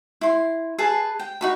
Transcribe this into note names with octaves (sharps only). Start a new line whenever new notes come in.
E4 C6
G#4 B4 A5
G5
D#4 F#4 B5